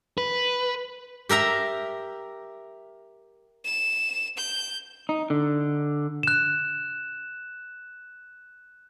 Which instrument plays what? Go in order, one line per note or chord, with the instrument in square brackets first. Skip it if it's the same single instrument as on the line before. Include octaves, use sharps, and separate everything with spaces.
[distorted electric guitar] B4
[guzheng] G4 A#4 E5 A#5
[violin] E7
G6
[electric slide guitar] D#4
D3
[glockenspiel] F#6 E7